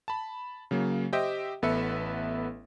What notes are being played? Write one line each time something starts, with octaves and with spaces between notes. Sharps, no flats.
A5 B5
C#3 F#3 A#3
G4 C5 D#5 E5 G5
A1 B3 A4 B4 E5 C#7